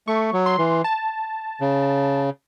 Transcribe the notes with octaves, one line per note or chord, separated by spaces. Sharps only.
A3 C#6
F#3
C6
E3
A5
C#3